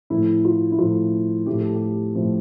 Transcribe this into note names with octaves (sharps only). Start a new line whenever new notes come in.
A2 F3 A3 E4
F4
E4
A2 F3 A3 F4
A2 F3 A3 G4
A4
G4
A2 F3 A3